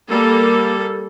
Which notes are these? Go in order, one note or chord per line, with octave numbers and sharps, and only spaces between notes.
G3 A#3 A4